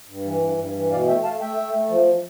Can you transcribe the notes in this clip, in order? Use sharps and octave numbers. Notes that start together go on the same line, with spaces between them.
G2
E3
G2
G2
E3
B2 D5 F5
A3 E5 G5
A3 F5 A5
A3 E5 G5
A3
A3
F3